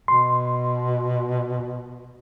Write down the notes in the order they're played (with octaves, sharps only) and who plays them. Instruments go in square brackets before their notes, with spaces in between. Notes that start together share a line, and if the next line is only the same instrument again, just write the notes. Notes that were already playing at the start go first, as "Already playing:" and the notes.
[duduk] B2 [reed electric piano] C6